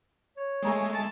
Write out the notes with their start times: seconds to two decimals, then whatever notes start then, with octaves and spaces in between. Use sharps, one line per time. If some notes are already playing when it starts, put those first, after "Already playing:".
0.37 C#5
0.63 G#3 A3 G#4 A#5 C#6
0.94 A5